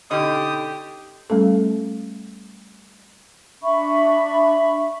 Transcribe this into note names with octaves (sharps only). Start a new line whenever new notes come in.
B2 D3 C#4 D#4 G4 D#5 D#6
G3 A3 C#4 A4
D4 E5 B5 C#6